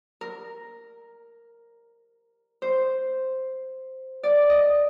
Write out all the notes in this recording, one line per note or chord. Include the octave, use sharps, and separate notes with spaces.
A#4
C5
D5
D#5